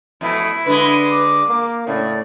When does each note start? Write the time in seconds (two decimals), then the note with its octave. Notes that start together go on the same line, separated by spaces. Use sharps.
0.21 F2 B2 A3 E4
0.66 D3 G#3 B4
1.10 D6
1.48 A#3
1.87 A2 C#3 D5